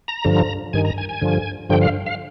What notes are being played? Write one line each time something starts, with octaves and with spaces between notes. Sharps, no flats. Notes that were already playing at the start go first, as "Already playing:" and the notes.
A#5
G2 D3 F3
G2 D#3 G#5
A#5
G#5
G#5
G2 D3 F3
G2 D3 F3 G5
F5
F5